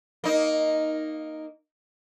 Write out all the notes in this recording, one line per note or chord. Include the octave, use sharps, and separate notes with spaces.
A#3 D#4